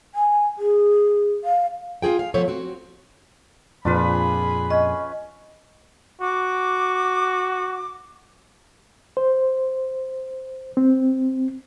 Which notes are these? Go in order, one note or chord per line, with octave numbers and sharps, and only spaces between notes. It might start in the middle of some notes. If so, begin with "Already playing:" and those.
G#5
G#4
F5
F4 F#4 G#4 G5
F5
F3 B3 A4 C5 C#5
C4 F#4
F2 A#2 D4 F4 G#4 B4 B5
C#4 D#5
F#4 D6
C5
C4